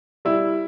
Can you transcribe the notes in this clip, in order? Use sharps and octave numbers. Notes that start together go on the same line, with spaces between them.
G3 E4